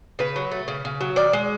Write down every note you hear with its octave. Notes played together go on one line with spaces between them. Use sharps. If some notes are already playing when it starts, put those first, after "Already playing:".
C#3 B4
F#3
A3
C#3
C#3
F#3
D#3 D5
G#3